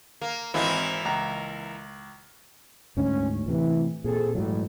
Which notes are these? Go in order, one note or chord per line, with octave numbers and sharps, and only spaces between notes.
A#3
G#1 E3 A#3 C4 E4
C#2 A#5
D2 G#2 C#4
A2 C3 E3
A#2 C4 G#4 A4
A1 G#2 F#3